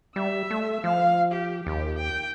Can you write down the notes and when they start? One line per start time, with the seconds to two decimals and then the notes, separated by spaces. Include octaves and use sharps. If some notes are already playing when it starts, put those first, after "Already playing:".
0.16 G3 E5 E6
0.51 A3
0.84 F3 F5
1.32 G4
1.67 D#2 G4
1.98 G5